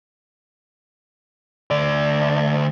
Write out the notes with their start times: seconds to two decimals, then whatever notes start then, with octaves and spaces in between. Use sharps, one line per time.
1.71 D2 D5